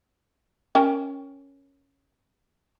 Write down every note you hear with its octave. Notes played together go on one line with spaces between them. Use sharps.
C#4 A#4 G5